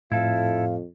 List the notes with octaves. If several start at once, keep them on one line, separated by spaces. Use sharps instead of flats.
F2 A2 E4 A4 F5